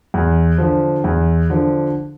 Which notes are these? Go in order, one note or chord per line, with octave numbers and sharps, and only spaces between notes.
E2
D3 F3
E2
D3 F3